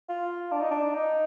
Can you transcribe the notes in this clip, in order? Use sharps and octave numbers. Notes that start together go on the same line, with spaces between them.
F4
D4
D#4
D4
D#4